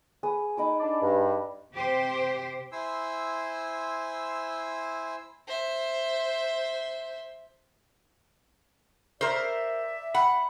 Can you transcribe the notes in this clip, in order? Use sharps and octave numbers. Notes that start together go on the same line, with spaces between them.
G#4 B4 D#6
D#4 B5 D6
D4 D5
G2
C3 G4 C5
E4 C5 G#5 C6 E6
C5 E5
A#4 C5 D5 E5
F#5 B5